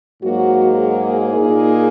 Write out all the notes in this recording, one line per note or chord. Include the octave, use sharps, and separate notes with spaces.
G#2 F#3 A#3 F#4
G#4
A#2 A#3 D#4